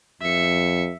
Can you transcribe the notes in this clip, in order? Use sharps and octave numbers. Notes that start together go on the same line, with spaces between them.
F2 E5 C#7